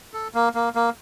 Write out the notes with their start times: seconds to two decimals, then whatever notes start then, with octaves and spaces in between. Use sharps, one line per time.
0.14 A4
0.34 A#3
0.55 A#3
0.75 A#3